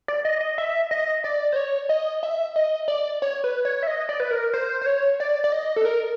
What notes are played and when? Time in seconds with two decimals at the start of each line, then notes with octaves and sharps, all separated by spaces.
0.08 D5
0.25 D#5
0.41 D#5
0.58 E5
0.91 D#5
1.24 D5
1.52 C5
1.56 C#5
1.89 D#5
2.23 E5
2.56 D#5
2.88 D5
3.22 C#5
3.44 B4
3.65 C#5
3.83 E5
3.87 D#5
4.09 D5
4.20 B4
4.31 A#4
4.54 C5
4.82 C5
4.86 C#5
5.20 D5
5.44 D5
5.52 D#5
5.76 A4
5.85 A#4